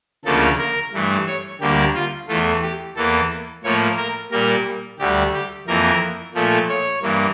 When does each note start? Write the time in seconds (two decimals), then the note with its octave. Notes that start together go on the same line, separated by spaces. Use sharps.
0.25 D2 C#3 F3 A#3 A4
0.59 A#4
0.93 G2 E3 A3
1.27 C#5
1.61 D2 D3 G3 A#3 G4
1.95 F4
2.28 E2 E3 A3 F4
2.62 G4
2.96 E2 E3 A#3 A4
3.64 A2 F3 A#3 C#5
3.97 A#4
4.32 A#2 G3 A#3 A#4
4.99 D2 D3 G3 G4
5.33 G4
5.67 F2 E3 A#3 A#4
6.35 A#2 F3 A3
6.69 C#5
7.02 G2 E3 A#3